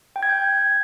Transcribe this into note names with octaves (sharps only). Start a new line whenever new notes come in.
G5
G#6
G6